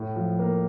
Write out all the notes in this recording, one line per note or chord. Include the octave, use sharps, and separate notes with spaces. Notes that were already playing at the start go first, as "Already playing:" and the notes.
Already playing: A2
F3
A#3